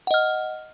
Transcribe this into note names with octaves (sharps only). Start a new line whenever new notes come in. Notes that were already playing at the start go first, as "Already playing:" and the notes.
D#5 F#5 F6